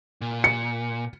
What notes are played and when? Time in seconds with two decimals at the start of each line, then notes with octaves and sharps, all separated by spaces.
0.21 A#2
0.44 C#7